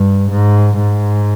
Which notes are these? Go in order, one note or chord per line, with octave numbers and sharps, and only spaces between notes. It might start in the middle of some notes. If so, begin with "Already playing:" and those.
Already playing: G2
G#2
G#2